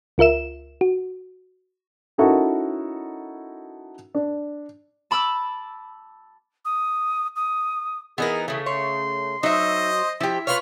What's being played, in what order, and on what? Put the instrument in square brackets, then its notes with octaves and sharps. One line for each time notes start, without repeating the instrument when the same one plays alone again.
[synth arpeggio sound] C#2 F4 A#4 E5 E7
F#4
[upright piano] C#4 D#4 E4 F#4 A4 A#4
D4
[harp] A5 B5 D6 E6
[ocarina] D#6
D#6
[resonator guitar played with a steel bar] E3 [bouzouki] B3 D#4 A#4 [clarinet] G#4
[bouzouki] C#3 A3 [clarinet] G#4
[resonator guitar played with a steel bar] C#5 [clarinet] C6
[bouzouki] F#3 [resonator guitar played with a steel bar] D#4 E5 [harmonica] C5 D#5
[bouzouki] F3 G4 [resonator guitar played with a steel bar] E4 [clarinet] E5
[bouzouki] B3 F4 C#5 [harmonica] F6